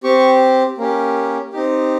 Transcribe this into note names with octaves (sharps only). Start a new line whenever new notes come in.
C4 G4 C#6
A#3 C#4 G4
C4 D#4 G4